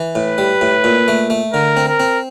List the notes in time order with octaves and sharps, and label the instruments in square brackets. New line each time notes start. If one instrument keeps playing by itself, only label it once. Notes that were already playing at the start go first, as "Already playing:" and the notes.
Already playing: [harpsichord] E3
[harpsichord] A2 [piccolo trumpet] B4
[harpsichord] G3
A2
A#2
A3
A3
[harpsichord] D3 [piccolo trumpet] A#4
[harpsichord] C4
[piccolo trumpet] A#4
[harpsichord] C4